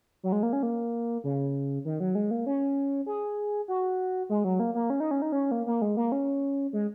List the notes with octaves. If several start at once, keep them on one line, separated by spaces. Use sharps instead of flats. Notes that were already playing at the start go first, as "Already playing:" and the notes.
F#3
G#3
A#3
C#4
A#3
C#3
D#3
F#3
G#3
A#3
C#4
G#4
F#4
G#3
F#3
A#3
A#3
C#4
D#4
C#4
D#4
C#4
A#3
A#3
G#3
A#3
C#4
G#3